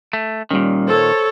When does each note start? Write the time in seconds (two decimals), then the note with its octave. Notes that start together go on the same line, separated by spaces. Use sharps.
0.13 A3
0.51 A#2 D#3 G3 C#4
0.88 A4 C5 C#5